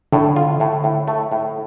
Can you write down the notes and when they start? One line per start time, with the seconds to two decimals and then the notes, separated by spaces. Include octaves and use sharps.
0.12 A2 D3
0.36 F4
0.60 A2
0.84 A2
1.08 A3
1.32 A2